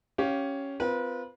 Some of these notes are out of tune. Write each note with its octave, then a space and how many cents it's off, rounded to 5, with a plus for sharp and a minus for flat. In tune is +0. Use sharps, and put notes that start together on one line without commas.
C#4 +0 G4 -15 F5 +0
C4 -40 F4 +0 B4 -35